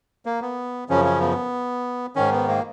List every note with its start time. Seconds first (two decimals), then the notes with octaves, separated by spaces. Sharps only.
0.26 A#3
0.42 B3
0.89 F#2 C#3 F3 C#4
1.05 C#4
1.21 B3
2.16 G#2 D#3 C#4
2.32 B3
2.48 A#3